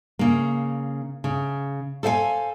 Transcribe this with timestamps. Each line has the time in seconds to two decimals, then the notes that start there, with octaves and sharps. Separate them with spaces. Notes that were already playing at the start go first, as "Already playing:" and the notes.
0.19 C#3 A#3
1.24 C#3
2.03 A4 C5 F5 F#5 G#5